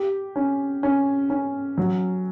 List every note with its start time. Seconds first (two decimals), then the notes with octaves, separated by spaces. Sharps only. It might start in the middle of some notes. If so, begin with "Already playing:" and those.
Already playing: G4
0.36 C#4
0.83 C#4
1.30 C#4
1.78 F#3